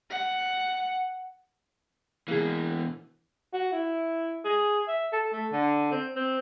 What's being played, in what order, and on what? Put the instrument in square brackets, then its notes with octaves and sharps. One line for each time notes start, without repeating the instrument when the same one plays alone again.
[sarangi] F#5
[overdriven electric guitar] B2 E3 [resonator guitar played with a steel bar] A#3 G#4
[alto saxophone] F#4
E4
G#4
E5
A4
A3
D3
C4
C4